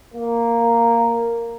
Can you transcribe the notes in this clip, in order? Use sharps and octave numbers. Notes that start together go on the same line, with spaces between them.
A#3